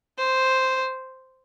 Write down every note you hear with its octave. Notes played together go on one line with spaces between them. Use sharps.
C5